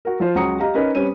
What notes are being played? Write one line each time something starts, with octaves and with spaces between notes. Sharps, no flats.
F#4 A#4
F3 F4 C5
C#2 F#3 F#4 A#5 D#6 C#7
G4 D#5 F5 A#5
C#4 D#4 A#4 B4 D#5
G3 C4 C#4 B4 C#5 D#7